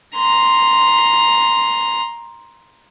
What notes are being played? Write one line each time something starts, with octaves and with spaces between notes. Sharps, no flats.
A#5 C6